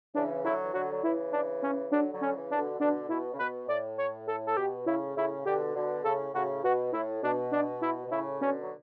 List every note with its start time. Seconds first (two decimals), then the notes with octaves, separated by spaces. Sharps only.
0.15 C#3 E3 D4
0.44 D3 F#3 E4
0.63 E3
0.73 D3 F#3 F#4
0.92 F#3
1.03 C#3 E3 E4
1.32 D4
1.62 C#4
1.91 D3 F#3 D4
2.14 D3 F#3
2.21 C#4
2.35 C#3 E3
2.51 D4
2.58 B2 D3
2.80 B2 D3 D4
3.09 B2 E4
3.33 C#3
3.38 B2 B4
3.68 A2 D5
3.98 C#5
4.27 A4
4.47 A4
4.56 B2 G4
4.86 A2 C#3 E4
5.16 A2 C#3 E4
5.45 B2 D3 G4
5.75 B2 D3
6.04 A2 C#3 A4
6.33 A2 C#3 F#4
6.64 B2 F#4
6.92 A2 E4
7.23 B2 D4
7.52 D4
7.81 E4
8.05 B2
8.11 A2 C#3 E4
8.40 B2 D3 C#4
8.62 F#3